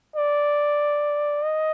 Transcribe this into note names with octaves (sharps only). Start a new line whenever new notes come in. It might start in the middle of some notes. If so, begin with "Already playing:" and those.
D5
D#5